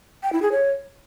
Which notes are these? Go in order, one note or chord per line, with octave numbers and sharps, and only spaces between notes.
G5
E4
G#4
C#5